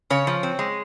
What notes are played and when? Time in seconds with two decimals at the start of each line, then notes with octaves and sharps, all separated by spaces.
0.10 C#3 C#5
0.27 F3
0.43 C4
0.59 G#3